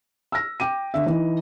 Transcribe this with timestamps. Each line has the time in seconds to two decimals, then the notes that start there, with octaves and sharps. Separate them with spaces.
0.32 E6 F6 A#6
0.60 G5 D6 D#7
0.94 D3 E5
1.06 E3 D#4